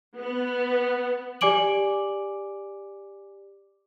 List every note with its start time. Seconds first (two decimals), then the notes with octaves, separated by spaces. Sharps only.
0.19 B3
1.41 G4 D5 G#5 D6 D7 F#7